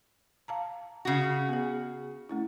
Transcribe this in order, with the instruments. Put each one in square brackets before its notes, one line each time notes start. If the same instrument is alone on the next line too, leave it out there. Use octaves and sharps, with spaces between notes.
[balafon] F5 A5 A#5
[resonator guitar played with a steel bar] C#3 F#4
[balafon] B3 G#4
A3 C#4 E4